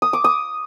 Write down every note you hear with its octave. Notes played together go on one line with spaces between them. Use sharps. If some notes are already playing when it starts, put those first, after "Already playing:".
D#6
D6
D#6